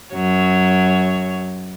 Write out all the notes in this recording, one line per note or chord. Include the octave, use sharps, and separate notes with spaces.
F#2 F#3 C#5